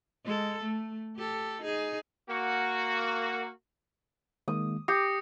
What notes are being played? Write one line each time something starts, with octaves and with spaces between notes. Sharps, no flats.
G#3 A4
A3
G4 A4
D#4 G#4
A#3 F#4
D#3 G#3 A#3 D#6
G4 D#6 A#6 C7 C#7